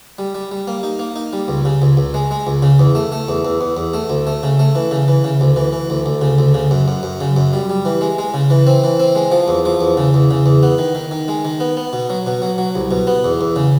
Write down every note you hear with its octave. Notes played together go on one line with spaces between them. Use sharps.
G3
G3
G3
A#3
D#4
A#3
D#4
G3
C#2
C#3
C#2
C#2
G#3
G#3
C#2
C#3
E2
A3
A3
E2
E2
E2
E2
A3
D2
A3
C#3
A3
E3
C#3
E3
C#3
D2
E3
E3
D2
D2
C#3
D2
C#3
F#2
F#2
F#2
C#3
F#2
G3
G3
E3
G#3
G#3
C#3
E3
C4
E3
C4
G#3
F3
E2
F3
E2
C#3
E2
C#3
E2
B3
D#3
D#3
D#3
G#3
D#3
B3
B3
B2
F#3
B2
F#3
F#3
C2
B2
B3
E2
E2
C#3